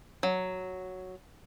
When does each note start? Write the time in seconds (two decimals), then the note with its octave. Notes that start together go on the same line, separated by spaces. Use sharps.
0.23 F#3